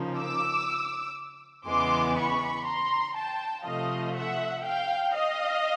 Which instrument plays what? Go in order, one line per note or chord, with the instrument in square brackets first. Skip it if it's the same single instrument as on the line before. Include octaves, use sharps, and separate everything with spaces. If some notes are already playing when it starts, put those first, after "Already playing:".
Already playing: [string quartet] C#3 F3 A#3 D#4
[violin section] D6 E6
[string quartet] E2 C#3 E3 G#3 B3 [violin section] C6 D6
[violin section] B5 C#6
A#5 C6
G5 A5
[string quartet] C3 F3 A3 [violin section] D#5 F5
[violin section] E5 F#5
F5 G5
D#5 F5